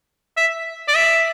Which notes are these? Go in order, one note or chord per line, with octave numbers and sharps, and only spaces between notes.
E5
D5
E5